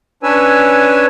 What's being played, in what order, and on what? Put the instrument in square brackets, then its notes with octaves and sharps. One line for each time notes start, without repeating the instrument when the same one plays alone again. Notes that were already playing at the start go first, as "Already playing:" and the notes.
[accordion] C#4 D4 B4 C#5 G#5 E6